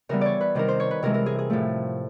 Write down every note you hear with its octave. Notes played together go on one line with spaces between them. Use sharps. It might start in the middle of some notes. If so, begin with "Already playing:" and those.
C#3 E3 G3 B3 A#4
C#5 D5
B4
C3 D#3 G3 C4 A#4
C5
C#5
B4
C3 E3 G#3 A#4
A#4
G#4
G#4
A2 F3 A3